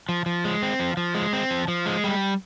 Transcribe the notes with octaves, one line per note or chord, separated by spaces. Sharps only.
F3
F3
G#3
C4
F3
F3
G#3
C4
F3
F3
G#3
G3